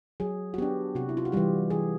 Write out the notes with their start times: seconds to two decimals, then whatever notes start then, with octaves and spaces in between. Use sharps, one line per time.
0.20 F#3 G#4
0.54 F#4
0.58 B3 D4 G4
0.95 C3 F#4
1.09 E4
1.17 F4
1.25 F#4
1.32 E3 G3 G4
1.70 E3 G#4